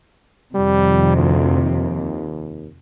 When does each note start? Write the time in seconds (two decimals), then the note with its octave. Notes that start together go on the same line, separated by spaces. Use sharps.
0.54 F2 C3 D#3 G3
1.16 D2
1.62 D#2